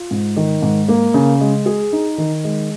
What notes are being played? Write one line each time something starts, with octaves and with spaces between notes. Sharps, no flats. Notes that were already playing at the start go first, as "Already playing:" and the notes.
Already playing: F4
G#2
D#3
G#2
A#3
C#3
G#3
G#4
D#4
D#3
G#3